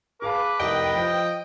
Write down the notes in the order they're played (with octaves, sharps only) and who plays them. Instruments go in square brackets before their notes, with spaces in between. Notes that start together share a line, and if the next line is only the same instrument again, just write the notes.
[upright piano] G#4 F5 A5 [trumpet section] B4 [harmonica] D6
[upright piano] F1 C2 [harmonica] D#5 [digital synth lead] G5
[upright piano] F3